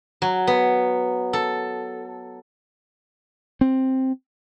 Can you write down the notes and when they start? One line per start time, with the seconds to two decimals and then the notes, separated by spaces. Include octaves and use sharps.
0.22 F#3
0.47 B3
1.33 A4
3.61 C4